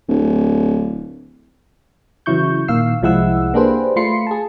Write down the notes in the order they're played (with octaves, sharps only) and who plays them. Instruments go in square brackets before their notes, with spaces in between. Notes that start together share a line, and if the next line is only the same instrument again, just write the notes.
[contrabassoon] D1
[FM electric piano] C#3 E3 F#3 E4 C#6 G6
A#2 D#3 F5 E6 C7
C2 F3 G#3 E4 F#5 E6
A#3 D4 G4 G#4 B4 C5
A3 F4 B5 C6 C7 C#7
G#4 A5